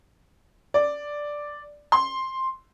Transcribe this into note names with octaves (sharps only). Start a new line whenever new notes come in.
D5
C6